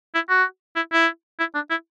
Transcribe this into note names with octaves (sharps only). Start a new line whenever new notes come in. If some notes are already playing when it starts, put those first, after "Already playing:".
E4
F#4
E4
E4
E4
D4
E4